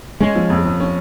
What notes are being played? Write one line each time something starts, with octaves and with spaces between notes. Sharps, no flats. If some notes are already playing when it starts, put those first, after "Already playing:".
G#3 C#4
F3
F2
F2
C#4